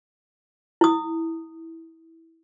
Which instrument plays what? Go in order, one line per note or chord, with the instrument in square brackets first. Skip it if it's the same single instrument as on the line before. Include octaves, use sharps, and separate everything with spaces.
[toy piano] E4 D#6